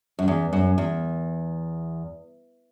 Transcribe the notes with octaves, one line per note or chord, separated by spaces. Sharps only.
F#2
E2
F#2
E2